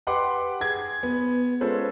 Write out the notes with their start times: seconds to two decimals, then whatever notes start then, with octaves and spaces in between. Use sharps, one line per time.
0.07 G4 B4 F#5 C6 D6
0.61 G#4 G#6
1.03 B3
1.61 G#3 C#4 F4 A4 B4 C5